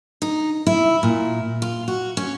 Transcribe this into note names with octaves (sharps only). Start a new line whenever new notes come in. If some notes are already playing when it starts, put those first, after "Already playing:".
D#4
E4
A#2
F4
F#4
C#4